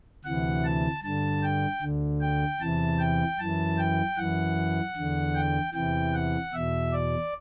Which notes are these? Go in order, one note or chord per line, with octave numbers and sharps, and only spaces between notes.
D2 C3 E3 F#5
A5
G2 D3 A5
G5
D2 D3
G5
E2 C3 E3 A5
G5
F#2 E3 A5
G5
F#2 E3 F#5
E2 D3
G5
E2 C3 E3 G5
F#5
E2 B2 E5
D5